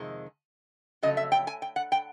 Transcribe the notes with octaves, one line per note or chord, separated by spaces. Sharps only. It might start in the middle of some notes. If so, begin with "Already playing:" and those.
Already playing: F2 C3 D#3 G#3
F2 C#3 F#3 A3 D#5
E5
G5
G#5
G5
F#5
G5